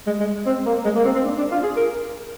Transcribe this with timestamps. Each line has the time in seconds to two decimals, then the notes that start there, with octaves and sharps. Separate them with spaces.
0.07 G#3
0.20 G#3
0.46 C4
0.66 A#3
0.85 G#3
0.95 A#3
1.05 C4
1.15 C4
1.24 D4
1.38 D4
1.51 F4
1.64 G#4
1.77 A#4